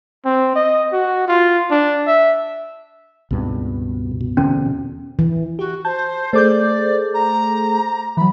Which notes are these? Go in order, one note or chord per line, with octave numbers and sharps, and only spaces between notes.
C4
D#5
F#4
F4
D4
E5
C#2 G2 B2 C4
B2
E2 D3 C4 C#4
E3
F#4 G4
C5 A5 G6
A3 G#4 A4 C5 D5 D6 G6
A#5
E3 F#3 B5